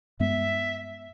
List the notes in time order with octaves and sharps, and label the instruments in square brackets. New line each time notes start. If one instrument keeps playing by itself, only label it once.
[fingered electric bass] G2 G#3 B3 [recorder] E5